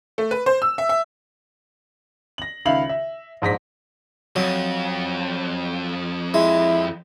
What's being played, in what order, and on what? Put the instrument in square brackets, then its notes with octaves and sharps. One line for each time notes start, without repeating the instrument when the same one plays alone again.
[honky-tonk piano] A3
B4
C5
E6
E5
E5
[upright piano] A#6 F#7
C#2 D#3 E5 F5 B5 F#7
E5
A#1 G#2 A#6 B6
[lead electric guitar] F2 [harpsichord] F#3
[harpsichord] G#3 [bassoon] E4